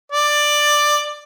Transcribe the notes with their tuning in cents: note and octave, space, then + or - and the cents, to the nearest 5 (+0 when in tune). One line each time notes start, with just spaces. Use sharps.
D5 +10